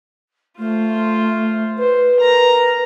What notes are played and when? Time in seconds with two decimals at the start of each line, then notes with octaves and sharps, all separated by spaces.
0.58 A3 F4 C5
1.78 B4 C5
2.17 A#4 A#5